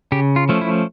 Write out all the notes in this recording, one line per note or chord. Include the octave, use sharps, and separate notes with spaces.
C#3 G4
F4
F3 A3 C#4
E4